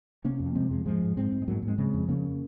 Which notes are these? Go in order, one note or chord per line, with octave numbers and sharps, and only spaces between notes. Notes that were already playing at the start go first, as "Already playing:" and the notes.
C3 A#3 C#4
F2
C3 G#3 C4
F2 F3 G#3
G#2 F3 G#3
G#2
G#2 G#3 C4
G#2
G#3
G#2 F#3 A#3
G#2
G#3 C4
C#3 G#3 C4
F2
C#3 A#3 C#4